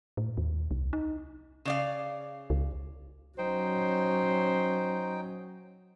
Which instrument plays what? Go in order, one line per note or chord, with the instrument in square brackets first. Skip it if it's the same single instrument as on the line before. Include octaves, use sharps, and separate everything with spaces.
[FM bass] A2
D#2
C2
D#4
[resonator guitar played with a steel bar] C#3 D5 F5
[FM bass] C#2
[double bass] F#3 C#4 [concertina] D#4 G5 [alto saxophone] C5